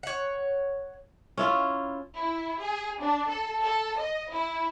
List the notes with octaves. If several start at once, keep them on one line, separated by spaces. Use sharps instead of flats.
C#5 F#5
C#4 E4 F4
E4
G#4
D4
A4
A4
D#5
E4